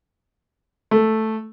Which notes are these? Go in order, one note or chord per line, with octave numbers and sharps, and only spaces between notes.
A3